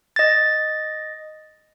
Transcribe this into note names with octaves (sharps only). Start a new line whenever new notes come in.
D#5 A6